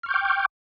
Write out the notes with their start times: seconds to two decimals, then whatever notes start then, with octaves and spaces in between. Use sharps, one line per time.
0.03 F6
0.06 C#6
0.09 G6
0.11 D6
0.14 G5